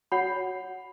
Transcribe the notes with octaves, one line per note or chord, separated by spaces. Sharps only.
F#4 C#5 F#5 B5